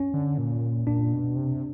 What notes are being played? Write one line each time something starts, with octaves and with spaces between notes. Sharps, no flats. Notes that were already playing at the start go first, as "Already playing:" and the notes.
Already playing: C#4
D3
A#2
A#2 D4
B2
C3